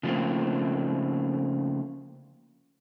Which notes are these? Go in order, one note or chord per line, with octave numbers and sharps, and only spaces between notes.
C#3 F3 G3 A3 A#3 C4